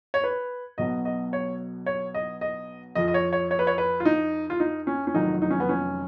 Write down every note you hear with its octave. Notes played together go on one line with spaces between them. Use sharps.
C#5
B4
B1 B2 F#3 D#5
D#5
C#5
C#5
D#5
D#5
F2 F3 D#5
D#5
C#5
C#5
C#5
B4
C#5
B4
F4
D#4
F4
D#4
C#4
C#4
F1 F2 D#3 F#3 D#4
D#4
C#4
B3
C#4